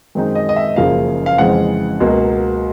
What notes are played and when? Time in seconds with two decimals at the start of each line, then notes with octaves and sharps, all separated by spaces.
0.15 F#2 D#3 G#3 C4 D#4
0.35 D#5
0.49 D#5
0.56 E5
0.76 F#1 F#2 C#3 F3 A#3 F5
1.26 F5
1.38 F2 C#3 E3 G#3 C4 F#5
2.00 C#2 B2 F#3 A#3